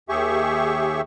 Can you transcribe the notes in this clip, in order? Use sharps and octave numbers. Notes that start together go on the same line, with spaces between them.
D#2 G4 G#4 E5 C#6